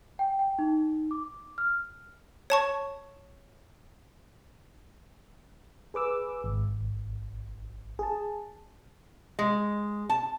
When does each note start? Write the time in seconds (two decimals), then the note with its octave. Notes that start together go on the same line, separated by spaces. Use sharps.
0.19 G5
0.39 G5
0.59 D#4
1.11 D6
1.58 F6
2.50 C#5 A5 C#6
5.94 G#4 B4 D6 E6
6.44 G#1
7.99 G#4 A5
9.39 G#3
10.09 A5